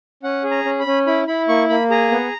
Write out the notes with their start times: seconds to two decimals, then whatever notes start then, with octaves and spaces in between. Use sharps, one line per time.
0.23 C#4 F#5
0.44 G#4
0.51 A#5
0.65 C#4
0.80 B5
0.86 C#4
1.07 E4 B5
1.28 E4 B5
1.48 A#3 C#6
1.69 A#3 B5
1.90 G#4 A#5
2.11 B3